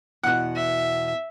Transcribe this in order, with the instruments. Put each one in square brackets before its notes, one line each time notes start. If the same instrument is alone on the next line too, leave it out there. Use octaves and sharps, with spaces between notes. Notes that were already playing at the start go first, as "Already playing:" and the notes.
[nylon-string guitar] E2 B2 F#4 [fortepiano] F#5 F#6
[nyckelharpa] E5